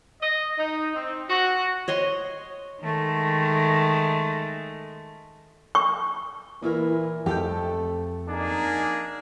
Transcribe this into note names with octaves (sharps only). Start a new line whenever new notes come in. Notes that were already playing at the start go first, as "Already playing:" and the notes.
D#5
D#4
C4
F#4
C#5 D#5 C6
D#3 G#3 A3
C#6
A#2 E3 E4 A#4
F2 A3 G4 A4 G5
A#3 D4 D#4 G#4